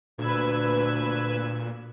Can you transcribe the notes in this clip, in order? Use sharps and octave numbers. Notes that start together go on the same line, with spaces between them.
D2 A#2 B4 E6 G#6